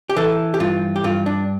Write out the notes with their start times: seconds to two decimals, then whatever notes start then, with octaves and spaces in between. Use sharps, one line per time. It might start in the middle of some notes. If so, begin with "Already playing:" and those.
0.09 G4
0.17 E3 A4
0.54 G4
0.60 G2 F4
0.96 G4
1.04 G2 F4
1.26 D4